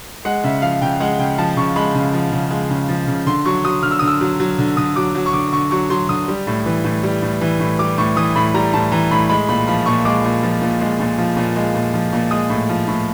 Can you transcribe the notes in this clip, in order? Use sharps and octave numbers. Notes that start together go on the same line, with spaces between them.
G#3 F#5
C#3 E5
F3 F5
C#3 G5
G#3 F#5
C#3 G5
F3 A5
C#3 C#6
G#3 B5
C#3
F3
C#3
G#3
C#3
F3
C#3
D3 C6
F#3 C#6
F#3 D#6
D3 F6
E6
D3 D#6
E6
F#3
F#3
D3
D3 D#6
F#3 D6
F#3
C#6
D3 D6
D3 C#6
F#3 C#6
F#3 C6
D3 D#6
G3
A2
E3
A2
G3
A2
E3
A2
G3 D6
A2 C#6
E3 D#6
A2 B5
G3 A#5
A2 A5
E3 A#5
A2 B5
G#3 B5
A#2 B5
F3 B5
A#2 C#6
G#3 D6
A#2
F3
A#2
G#3
A#2
F3
A#2
G#3
A#2
F3
A#2
G#3 D#6
A2
F3
A2